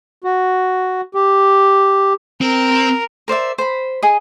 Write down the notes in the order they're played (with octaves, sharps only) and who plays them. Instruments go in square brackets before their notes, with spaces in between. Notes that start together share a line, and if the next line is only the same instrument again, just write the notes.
[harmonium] F#4
G4
[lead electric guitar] C4 [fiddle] A#4
[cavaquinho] A#4 C5 D5 E5
C5 B5
G#4 D#5